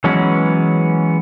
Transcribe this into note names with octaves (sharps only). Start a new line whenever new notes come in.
E3 F#3 G#3 B3 C#4